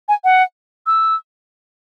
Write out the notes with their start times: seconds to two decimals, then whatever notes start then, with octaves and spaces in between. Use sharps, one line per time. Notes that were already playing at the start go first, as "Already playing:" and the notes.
0.08 G#5
0.24 F#5
0.87 E6